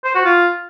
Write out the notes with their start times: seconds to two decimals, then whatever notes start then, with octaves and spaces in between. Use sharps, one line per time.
0.04 C5
0.15 F#4
0.25 F4